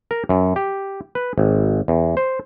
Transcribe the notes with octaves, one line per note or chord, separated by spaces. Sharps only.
A#4
F#2
G4
B4
G#1
E2
C5